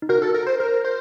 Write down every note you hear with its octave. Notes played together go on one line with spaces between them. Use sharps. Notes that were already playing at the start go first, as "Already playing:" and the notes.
D#4
F#4 A#4
A4
A#4
C5
A#4
C5